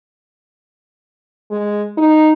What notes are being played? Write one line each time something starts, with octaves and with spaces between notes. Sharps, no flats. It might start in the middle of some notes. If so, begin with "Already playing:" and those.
G#3
D#4